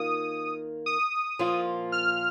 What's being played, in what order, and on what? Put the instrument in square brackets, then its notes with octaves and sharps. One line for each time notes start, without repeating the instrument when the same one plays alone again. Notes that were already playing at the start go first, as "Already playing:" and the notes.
Already playing: [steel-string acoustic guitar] D#3 A#3 F4 [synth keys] D#6
[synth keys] D#6
[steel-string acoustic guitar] A#2 F3 A#3 F4
[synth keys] F6